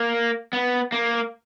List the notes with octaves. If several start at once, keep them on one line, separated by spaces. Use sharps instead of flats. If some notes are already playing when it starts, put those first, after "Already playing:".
Already playing: A#3
B3
A#3